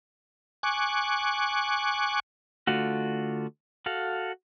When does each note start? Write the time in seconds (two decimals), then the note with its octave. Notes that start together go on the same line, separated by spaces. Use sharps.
0.63 G#5 C#6 D6 F#6
2.67 D3 A3 F4 F#4
3.86 F#4 A4 F5